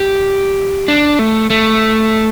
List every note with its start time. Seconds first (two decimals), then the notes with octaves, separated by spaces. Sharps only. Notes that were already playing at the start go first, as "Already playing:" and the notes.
Already playing: G4
0.88 D4
1.19 A3
1.50 A3